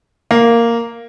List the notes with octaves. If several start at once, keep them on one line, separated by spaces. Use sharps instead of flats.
A#3